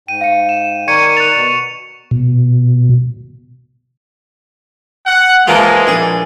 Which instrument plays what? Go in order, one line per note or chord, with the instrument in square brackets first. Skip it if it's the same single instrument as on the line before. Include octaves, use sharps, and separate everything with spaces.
[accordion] G#2 G5 [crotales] D#7
[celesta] F5 C#7
[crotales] E7
[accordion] D#3 A#4 D5 [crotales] C#6 C#7 D#7 [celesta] G#6
[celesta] F#6 A6 [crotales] F7
[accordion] B2
[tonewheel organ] B2
[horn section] F#5
[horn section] E3 G#3 [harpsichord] F3 A#3 F4
[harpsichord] A#1 G#4